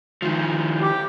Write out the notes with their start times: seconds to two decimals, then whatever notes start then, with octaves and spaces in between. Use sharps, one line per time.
0.22 D#3 F3
0.81 G4